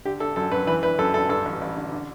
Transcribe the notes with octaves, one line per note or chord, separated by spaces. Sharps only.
D3 G4
D3 A4
F#2 A4
F#2 B4
E3 B4
E3 B4
F#2 A4
F#2 A4
G2 A4
A1
A1
D3
D3